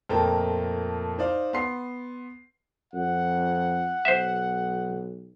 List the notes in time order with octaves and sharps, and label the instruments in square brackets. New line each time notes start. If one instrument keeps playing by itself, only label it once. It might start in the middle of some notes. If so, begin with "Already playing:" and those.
[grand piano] F2 A#2 A3 A#4 G5 A5
D#4 C5 D5 F5
B3 C6 C7
[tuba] F2 [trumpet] F#5
[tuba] B1 [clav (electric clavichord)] C5 E5